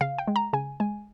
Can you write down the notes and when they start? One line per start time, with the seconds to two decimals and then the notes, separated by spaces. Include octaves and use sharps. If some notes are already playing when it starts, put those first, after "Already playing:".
0.01 C#3 F5
0.18 G5
0.28 G#3
0.36 A#5
0.53 C#3 G#5
0.80 G#3 G#5